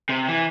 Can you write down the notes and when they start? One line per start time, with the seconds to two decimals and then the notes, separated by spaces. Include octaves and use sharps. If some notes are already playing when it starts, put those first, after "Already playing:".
0.09 C3
0.28 E3